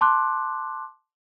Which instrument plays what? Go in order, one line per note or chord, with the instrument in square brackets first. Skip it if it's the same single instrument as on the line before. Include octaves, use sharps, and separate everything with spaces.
[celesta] A5 C6 D6 F#6